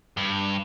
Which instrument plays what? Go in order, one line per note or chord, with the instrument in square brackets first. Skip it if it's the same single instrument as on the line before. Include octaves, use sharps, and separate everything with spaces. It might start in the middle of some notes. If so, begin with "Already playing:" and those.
[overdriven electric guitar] G2